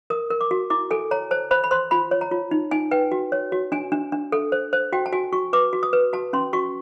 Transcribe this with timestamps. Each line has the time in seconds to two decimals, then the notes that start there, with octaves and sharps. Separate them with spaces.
0.10 A#4 D#6
0.30 A#4
0.41 D6
0.51 F#4
0.70 E4 D6
0.91 A4 G#5
1.11 C#5 A#5
1.31 C5 A5
1.51 C5 B5
1.64 B5
1.71 C5 C6
1.91 F4 B5
2.11 C#5
2.21 A#5
2.31 F4
2.51 D#4
2.71 D#4 G#5
2.91 B4 G5
3.12 F#4
3.32 C#5
3.52 F#4
3.72 D4 G#5
3.92 D4
4.12 D4
4.32 A4
4.52 C5
4.73 C5
4.93 F#4 G5
5.06 A5
5.13 F#4 G#5
5.33 F#4 C#6
5.53 B4 D6
5.73 F#4
5.83 D#6
5.93 B4
6.13 F#4 A5
6.33 C#4 C6
6.53 F#4 C#6